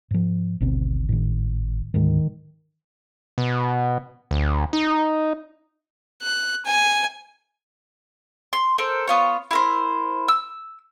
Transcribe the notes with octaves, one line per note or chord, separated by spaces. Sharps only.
G#2 F3
G#1 D2 B2 C4
A2 D#3
D2 G#2 D#3 G#3
B2
D2
D#4
F#6
G#5
C6
A4 A#4 C5
B3 F4 C#5
E4 A#4 C5
E6